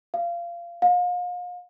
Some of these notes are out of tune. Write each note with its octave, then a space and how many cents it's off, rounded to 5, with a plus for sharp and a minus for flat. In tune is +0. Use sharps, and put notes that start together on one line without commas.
F5 -25
F5 +40